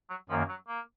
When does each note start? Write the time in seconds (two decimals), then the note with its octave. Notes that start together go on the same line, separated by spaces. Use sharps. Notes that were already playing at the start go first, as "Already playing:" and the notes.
0.10 F#3
0.29 F#2 D#3 F3 A#3
0.49 F#3
0.68 A#3